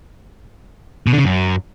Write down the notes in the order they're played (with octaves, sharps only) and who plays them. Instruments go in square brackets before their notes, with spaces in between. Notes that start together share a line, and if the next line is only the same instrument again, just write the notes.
[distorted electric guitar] B2
D3
C#3
F#2